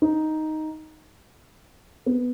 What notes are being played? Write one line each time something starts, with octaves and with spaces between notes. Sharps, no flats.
D#4
B3